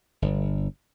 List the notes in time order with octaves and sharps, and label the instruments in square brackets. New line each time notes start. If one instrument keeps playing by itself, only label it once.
[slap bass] G1